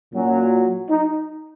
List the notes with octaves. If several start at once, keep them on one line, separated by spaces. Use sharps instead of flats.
A#2 F#3 C#4
D#4